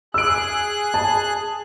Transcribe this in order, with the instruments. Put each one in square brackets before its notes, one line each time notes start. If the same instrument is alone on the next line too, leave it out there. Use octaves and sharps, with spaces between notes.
[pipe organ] G#4 F#6 [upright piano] E6 D7
[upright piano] A5